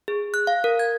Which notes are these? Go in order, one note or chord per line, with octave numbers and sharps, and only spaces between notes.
G#4
F#6
F5
A#4
G#6